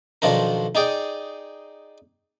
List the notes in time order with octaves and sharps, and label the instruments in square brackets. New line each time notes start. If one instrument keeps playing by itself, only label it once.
[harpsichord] B1 D#3 F3 D4 A#4
D#4 G#4 D5 G5